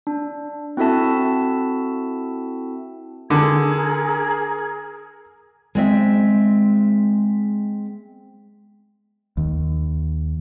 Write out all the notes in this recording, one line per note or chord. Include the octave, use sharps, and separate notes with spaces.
D4
C4 E4 F#4 A4 E5 A5
D3 G#4 A#4 G#6
G#3 C4 E5
D#2